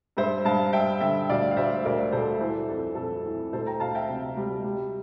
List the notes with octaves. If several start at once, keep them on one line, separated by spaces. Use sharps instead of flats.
G2 C5 E5
G2 F5 A5
G2 E5 G5
D3 E5 G5
D2 D5 F5
F5
D2 C5 E5
D2 A#4 D5
D2 A4 C5
E3 A4 C5
F2 A4
F2 A4
E3
D2 A4 C5
G5 A#5
D2 F5 A5
E5 G5
C3
G3
G3